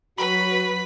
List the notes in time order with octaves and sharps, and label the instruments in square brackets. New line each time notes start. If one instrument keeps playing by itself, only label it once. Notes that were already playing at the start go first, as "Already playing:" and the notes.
[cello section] F#3 [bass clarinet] F#4 [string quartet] B4 [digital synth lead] B5